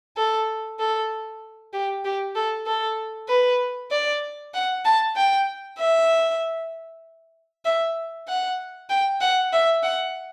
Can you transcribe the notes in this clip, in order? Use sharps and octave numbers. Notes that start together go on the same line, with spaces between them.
A4
A4
G4
G4
A4
A4
B4
D5
F#5
A5
G5
E5
E5
F#5
G5
F#5
E5
F#5